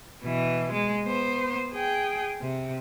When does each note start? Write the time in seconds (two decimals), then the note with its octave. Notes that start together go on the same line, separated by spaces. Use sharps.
0.24 B2 E3
0.73 G#3
1.05 B3 C5
1.74 G#4 G5
2.41 C3